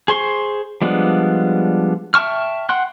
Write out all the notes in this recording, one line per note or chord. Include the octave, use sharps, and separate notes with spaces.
G#4 C5 C6 C#6
F3 G3 G#3 B3 D4
E5 G5 A5 C#6 F6
F#5 G5 C6 F#6